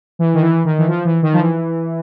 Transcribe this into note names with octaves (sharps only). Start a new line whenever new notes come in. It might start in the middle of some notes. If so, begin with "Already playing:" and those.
E3
D#3
E3
D#3
E3
F3
E3
D#3
F3
E3